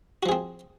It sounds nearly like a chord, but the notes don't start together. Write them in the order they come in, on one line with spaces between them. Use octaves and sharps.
F#4 F3 G#4 C4